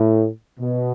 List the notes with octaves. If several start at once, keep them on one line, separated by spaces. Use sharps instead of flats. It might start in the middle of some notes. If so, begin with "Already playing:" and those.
Already playing: A2
B2